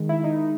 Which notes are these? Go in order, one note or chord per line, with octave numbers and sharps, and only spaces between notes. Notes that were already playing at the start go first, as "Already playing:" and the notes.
Already playing: D#3 G#3
E4
D#4